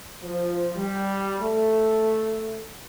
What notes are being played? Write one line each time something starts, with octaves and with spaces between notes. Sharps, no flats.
F3
G3
A3